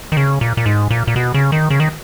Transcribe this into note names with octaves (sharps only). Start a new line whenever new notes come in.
D#3
C#3
A#2
A#2
G#2
A#2
A#2
B2
C#3
D#3
C#3
D#3